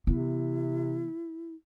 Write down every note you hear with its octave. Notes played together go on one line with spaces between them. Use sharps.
C3 E3 B3 E4